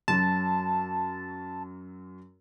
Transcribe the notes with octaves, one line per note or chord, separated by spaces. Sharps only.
F#2 F#3 A5